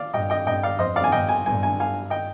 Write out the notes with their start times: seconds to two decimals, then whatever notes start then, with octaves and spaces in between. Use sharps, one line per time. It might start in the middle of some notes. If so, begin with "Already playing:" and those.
Already playing: D5 F5
0.14 G2 D#5 G5
0.30 D#5 G5
0.46 G2 D#5 G5
0.63 D5 F5
0.79 F2 C5 D#5
0.96 D5 F5
1.04 G#5
1.12 G2 D#5 G5
1.29 G#5
1.45 G2 G#5
1.63 G#5
1.80 F5 G#5
2.10 D#5 G5